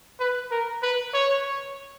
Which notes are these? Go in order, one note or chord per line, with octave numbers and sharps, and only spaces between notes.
B4
A#4
B4
C#5